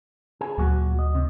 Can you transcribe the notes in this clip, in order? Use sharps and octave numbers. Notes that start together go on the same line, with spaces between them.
G#4
D2 A#2 F#3 F#4
D#5
C3